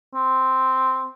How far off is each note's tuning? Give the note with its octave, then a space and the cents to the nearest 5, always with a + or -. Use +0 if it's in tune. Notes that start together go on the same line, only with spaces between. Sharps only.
C4 -5